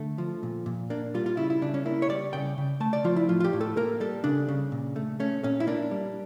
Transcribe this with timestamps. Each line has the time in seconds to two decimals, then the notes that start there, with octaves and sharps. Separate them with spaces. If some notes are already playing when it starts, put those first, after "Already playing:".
Already playing: D3 A3
0.18 F3
0.43 A#2
0.66 A#2
0.90 A#3 D4
1.14 G3 F4
1.26 F4
1.37 C#3 E4
1.50 E4
1.62 C#3 D4
1.74 C#4
1.85 A#3 E4
2.02 C#5
2.09 G3 D5
2.33 C#3 G5
2.58 C#3
2.80 A3 A5
2.93 D5
3.04 F3 F4
3.16 E4
3.29 A2 F4
3.40 F4
3.44 G4
3.53 A2
3.61 A4
3.77 A#3 A#4
4.00 G3 A4
4.24 C#3 D4
4.48 C#3
4.72 A#2
4.96 A3
5.20 A3 C#4
5.44 A#2 C#4
5.60 E4
5.67 A#3 D4
5.91 G3